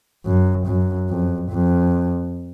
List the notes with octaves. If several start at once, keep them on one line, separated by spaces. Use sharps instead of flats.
F#2
F#2
F2
F2